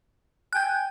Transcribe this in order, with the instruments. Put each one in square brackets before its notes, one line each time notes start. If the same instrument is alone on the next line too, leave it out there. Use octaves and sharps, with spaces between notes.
[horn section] G5 G#5 [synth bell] F#6 G6